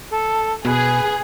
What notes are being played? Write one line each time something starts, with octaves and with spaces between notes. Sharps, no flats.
A4
B2 G#4 B4